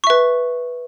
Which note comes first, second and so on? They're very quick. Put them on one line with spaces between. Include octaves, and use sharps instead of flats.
C#6 E5 B4